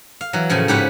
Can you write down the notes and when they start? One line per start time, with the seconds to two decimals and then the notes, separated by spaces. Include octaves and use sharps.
0.21 F5
0.33 E3 F#3
0.50 A2 C#3 F3 G#5
0.68 G#2 C#4 G4 B4 F#5 B5